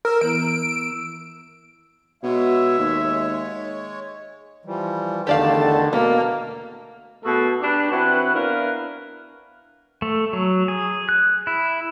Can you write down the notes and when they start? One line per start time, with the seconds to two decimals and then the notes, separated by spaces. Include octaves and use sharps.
0.05 A#4 E6
0.21 E3 B3 E4 D7
2.23 B2 G#3 C#5 E5
2.79 D#2
4.65 E3 F3 G3
5.27 E2 D3 D#3 A3 G4 D5 F5 A5
5.93 B2 A3 A#3
7.25 B2 A3 F#4 G#4 A4
7.62 D4 G4 B4
7.91 E3 C4 E4 F#4 B4
8.34 B3 D4 E4 A#4 B4 F5
10.02 A3
10.33 F#3
10.68 G#4
11.09 F#6
11.47 E4